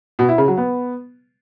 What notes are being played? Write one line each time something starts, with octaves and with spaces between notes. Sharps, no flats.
B2
E4
C#3
F#3
B3